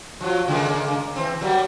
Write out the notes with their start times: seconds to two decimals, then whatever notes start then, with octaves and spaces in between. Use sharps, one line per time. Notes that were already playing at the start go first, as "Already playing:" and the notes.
0.21 F3 F#3 F4
0.48 C#3 G#3 A#3
1.16 E3 C4
1.41 F#3 G3 A#3